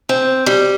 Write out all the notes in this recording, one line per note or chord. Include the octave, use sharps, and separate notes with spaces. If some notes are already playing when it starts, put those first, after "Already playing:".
C4
G3